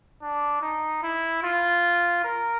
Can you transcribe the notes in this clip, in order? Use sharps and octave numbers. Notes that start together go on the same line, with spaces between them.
D4
D#4
E4
F4
A#4